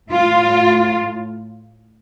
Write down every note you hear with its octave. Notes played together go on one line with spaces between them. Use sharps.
A2 F4